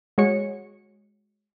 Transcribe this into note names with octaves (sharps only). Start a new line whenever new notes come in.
G#3 F#4 C#5 C#7